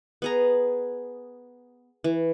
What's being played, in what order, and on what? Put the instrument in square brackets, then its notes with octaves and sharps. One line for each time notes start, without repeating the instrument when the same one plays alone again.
[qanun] B3 G#4 A#5
E3